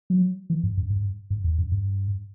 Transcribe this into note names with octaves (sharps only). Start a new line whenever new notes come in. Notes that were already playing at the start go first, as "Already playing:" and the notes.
F#3
E3
G2
F#2
G2
G2
E2
F#2
G2